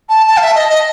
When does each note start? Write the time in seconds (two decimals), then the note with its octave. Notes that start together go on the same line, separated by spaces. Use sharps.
0.09 A5
0.27 A5
0.37 F5
0.41 E5
0.55 D#5
0.69 D#5